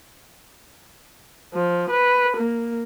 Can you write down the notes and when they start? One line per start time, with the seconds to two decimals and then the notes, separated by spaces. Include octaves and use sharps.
1.54 F3
1.90 B4
2.37 A#3